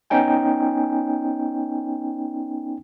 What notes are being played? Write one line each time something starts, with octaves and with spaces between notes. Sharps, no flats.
B3 C#4 D#4 G5 G#5